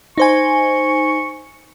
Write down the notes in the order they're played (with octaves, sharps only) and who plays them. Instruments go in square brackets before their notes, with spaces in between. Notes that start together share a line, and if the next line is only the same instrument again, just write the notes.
[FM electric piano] D#4 C5 G#5 [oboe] C#6